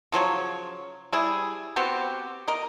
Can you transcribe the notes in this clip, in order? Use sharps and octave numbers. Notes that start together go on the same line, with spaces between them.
C#3 F3 F#3 C#5
G3 E4 G#4
B3 C4 F#4 G4
A#4 D#5